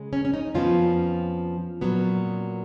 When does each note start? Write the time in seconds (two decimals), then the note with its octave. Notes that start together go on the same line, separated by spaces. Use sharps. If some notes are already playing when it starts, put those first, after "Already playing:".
Already playing: C#3 G#3
0.13 C#4
0.25 C#4
0.34 D#4
0.55 F2 F3 B3 C#4 F4
1.81 A#2 F#3 B3